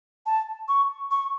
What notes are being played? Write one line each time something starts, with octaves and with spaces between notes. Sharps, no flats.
A5
C#6
C#6